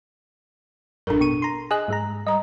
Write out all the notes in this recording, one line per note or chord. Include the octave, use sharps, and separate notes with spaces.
A1 F#2 D4 A4 A#4
B2 C#6 D#7
A#5 C6
G#4 D#5 G#5 F#6
G#2 G#3 A#5
G3 D#5 A#5